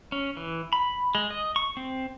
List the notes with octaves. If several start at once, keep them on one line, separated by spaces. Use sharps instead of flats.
C#4
E3
B5
G#3
D#5
C#6
C4